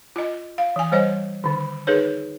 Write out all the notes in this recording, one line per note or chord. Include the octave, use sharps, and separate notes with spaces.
F4 D#5
F5
E3 G#5
G3 C5 C#5 D#5
D3 D#3
D#4 G#4 A#4 B4 C#5